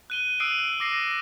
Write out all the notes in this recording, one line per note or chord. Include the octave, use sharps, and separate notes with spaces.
F#6 D#7 G7
D#6 E6 F#6 C7 D7 D#7
D6 A#6 C7 D#7